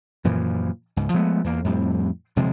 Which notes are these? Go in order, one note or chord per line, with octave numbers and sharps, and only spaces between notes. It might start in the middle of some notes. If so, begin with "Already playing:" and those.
F#2 A#2 E3 F3
C#2 G#2
F3 G#3 A3 B3
E2 A#3
F2 A2 G3 C4
D#1 C3 F3 G#3